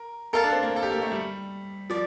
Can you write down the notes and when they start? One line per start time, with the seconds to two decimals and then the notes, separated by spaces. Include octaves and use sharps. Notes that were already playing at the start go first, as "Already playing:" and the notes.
Already playing: A#4
0.33 A4 A#4 F5 A5
0.44 D4
0.53 C4
0.63 A#3
0.76 A4
0.83 G4
0.92 A#3
1.02 A3
1.12 G3
1.90 F3 D5